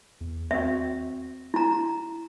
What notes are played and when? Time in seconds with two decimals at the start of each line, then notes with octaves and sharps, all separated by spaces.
0.21 E2
0.51 D#2 C4 F#4 E5
1.54 E4 A#5